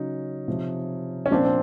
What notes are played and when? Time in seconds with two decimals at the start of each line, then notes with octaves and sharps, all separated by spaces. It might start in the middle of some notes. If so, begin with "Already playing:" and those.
Already playing: C#3 F#3 C#4 D#4
0.48 C3 F3
1.26 C#4
1.31 A#2 F3 C4 D4
1.45 C4